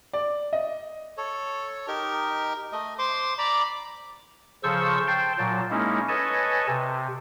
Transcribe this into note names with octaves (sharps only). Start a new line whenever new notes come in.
D5
D#5
A4 C#5
D#4 G4 A#4
A3 D#5
C5 C6 D6
D5 A#5 B5 D6
C#3 F3 A4 C5 C#6 E6
C5 G5 A5 C6
A#2 F#3 A5
G#3 A#3 C#4 D#4 E4
A4 B4 C#5 D#5 G#5 A5
C3